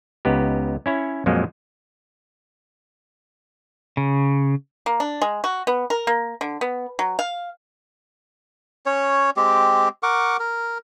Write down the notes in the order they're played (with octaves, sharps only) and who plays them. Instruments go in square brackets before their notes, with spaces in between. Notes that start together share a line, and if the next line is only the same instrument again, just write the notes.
[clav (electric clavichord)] C#2 B3 D#4 G4
C#4 E4 C#5
F2 A#2 F3 F#3 G#3
[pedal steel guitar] C#3
[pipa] A#3
D4
G#3
F#4
B3
A#4
A#3
D3
B3
F#3
F5
[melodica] C#4 C#5
G#3 C4 G4
A#4 F#5 C#6 D6
A#4